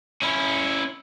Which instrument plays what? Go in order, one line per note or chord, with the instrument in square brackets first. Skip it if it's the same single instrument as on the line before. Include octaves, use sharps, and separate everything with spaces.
[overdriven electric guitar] C#4 E4